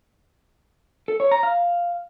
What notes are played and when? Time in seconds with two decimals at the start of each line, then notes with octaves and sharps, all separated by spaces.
1.08 A4
1.20 C#5
1.31 A#5
1.43 F5